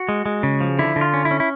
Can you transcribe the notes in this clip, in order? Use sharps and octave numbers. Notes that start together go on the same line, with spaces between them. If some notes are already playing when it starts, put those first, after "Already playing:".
Already playing: F#4
G#3
G#3
C#3
F3
D3 E4
D3
F4
C#4
E4
C#4
E4